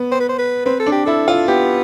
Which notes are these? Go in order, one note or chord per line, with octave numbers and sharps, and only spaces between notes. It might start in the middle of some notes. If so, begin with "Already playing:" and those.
Already playing: B3
C5
B4
C5
B4
C4 B4
A4
D4
G4
E4 A4
F4
B3 G4